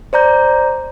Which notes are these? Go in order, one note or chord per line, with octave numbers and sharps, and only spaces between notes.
C5 D5 A#5 G6